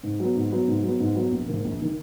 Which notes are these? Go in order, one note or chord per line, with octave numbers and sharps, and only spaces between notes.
G#2
F#3 B3
G#2
F#3 B3
G#2
F#3 B3
G#2
F#3 B3
A#1
G#2 D#3 A#3
A#1
D#3 A#3